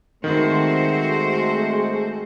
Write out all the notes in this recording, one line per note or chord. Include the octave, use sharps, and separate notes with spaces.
D#3 G#3 A3 C4 F#4 C5